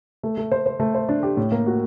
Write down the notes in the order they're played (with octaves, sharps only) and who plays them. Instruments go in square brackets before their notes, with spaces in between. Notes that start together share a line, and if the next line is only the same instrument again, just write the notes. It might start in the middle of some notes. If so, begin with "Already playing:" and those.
[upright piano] A3
A3
C5
C5
A3
C5
D4
G4
A2
A#3
F#4